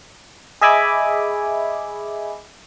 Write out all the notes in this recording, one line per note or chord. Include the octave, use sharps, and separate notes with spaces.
G#4 D#5 E5 G#5 B5 D6